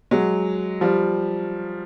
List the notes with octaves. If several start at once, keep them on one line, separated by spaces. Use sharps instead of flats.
F#3 G#3
F3 G3